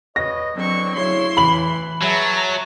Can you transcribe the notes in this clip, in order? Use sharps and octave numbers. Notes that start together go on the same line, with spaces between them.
B4 C#5 D#5 A#6
E2 D3 F#3 C4 C#6
D2 C#3 E4 C#5 C6
A2 E3 B5 F#7
F#3 G#4 B4 E5 A5 A#5